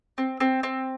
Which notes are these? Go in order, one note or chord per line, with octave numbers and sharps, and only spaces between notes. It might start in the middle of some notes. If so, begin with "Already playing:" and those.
C4
C4
C4